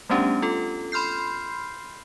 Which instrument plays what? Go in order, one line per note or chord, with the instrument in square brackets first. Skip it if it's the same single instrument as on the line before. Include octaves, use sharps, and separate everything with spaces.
[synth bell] G3 A3 B3 C#4 D4 G4
F4 A4
B5 C6 F6 G6 C7